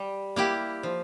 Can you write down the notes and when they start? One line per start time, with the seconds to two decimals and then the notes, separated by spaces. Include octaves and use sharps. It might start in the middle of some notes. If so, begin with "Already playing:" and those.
Already playing: G3
0.36 A#3 E4 G4
0.83 F3